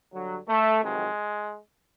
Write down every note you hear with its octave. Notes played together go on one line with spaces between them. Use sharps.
G2 D3 F#3
A3
F2 C3 D#3 F#3 G#3